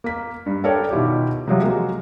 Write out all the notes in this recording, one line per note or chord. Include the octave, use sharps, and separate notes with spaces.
A#3 B6
G2
A4 A#4 C#5 D5 G5
B2 D#3 E4 F4 G4
C3 F3 F#3
G#3 A#3 F#4